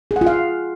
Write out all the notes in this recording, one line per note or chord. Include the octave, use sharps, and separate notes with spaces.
G#4
F#5
F4
F5